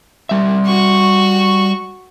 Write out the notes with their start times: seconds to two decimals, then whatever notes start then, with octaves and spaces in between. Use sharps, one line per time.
0.29 G3 E5
0.67 F#4 C#6